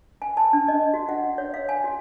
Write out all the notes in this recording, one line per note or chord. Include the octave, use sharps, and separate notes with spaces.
G#5
A5
D4
D#5
F#4
F#5
C#5
F5
G#5
F#4